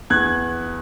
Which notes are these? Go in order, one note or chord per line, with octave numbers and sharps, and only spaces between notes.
E2 F#6 G#6